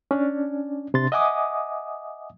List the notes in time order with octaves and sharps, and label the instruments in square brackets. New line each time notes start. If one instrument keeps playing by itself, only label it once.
[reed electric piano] C#4 D4 D5
C3 D4 C6 A6
D#5 E5 F#5 G#5 D6 D#6